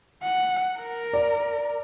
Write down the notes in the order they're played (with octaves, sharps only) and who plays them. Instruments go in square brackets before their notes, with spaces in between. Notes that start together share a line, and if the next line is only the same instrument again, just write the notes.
[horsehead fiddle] F#5
A#4
[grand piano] D5